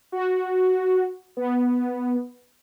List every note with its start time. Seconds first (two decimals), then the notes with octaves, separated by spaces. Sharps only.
0.12 F#4
1.37 B3